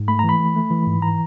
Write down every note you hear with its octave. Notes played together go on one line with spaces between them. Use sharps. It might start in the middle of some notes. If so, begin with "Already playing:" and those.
Already playing: G#2
A3 B5
E3 A#5
B5
A3
A3
E3
G#2
E3 A#5